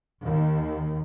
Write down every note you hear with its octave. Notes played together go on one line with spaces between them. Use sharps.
D#2